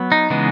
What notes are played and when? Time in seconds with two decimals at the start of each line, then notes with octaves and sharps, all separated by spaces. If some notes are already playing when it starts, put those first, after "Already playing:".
Already playing: F#3 B3
0.12 D#4
0.30 C#3 E3 G#3 B3